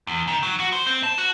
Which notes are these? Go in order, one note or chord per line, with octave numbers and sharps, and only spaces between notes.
E2
D#3
F#3
F#4
C5
C4
A5
F#4